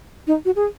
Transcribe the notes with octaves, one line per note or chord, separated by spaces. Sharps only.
D#4
F#4
G#4